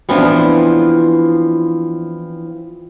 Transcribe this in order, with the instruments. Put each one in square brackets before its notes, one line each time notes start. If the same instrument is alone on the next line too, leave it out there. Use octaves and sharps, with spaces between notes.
[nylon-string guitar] E3 F3 B3 C4 D4